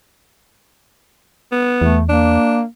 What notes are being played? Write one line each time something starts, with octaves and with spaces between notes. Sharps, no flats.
B3
E2 A3
A#3 D4